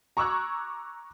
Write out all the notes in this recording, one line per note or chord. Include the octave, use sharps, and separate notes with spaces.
A#5 C#6 D6 E6 F#6 G#6